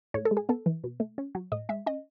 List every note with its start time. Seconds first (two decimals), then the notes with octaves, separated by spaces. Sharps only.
0.14 A2 C#5
0.25 A4
0.31 G#3
0.37 G#4
0.49 B3 A4
0.66 E3
0.84 B2
1.00 A3
1.18 C#4
1.35 F#3
1.52 A2 D#5
1.69 G#3 E5
1.86 C#4 D#5